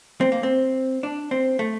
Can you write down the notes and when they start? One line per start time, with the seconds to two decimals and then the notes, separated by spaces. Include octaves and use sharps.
0.21 C4
0.32 A#3
0.43 C4
1.03 D4
1.31 C4
1.59 A3